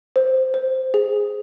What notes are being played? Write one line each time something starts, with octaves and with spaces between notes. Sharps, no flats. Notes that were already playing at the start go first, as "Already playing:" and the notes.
C5
C5
G#4